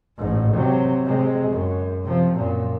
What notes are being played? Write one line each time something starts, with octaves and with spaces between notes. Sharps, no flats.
A1 G#2
C3 F#3
C3 G#3
F#2
C3 F3
F#2 A#2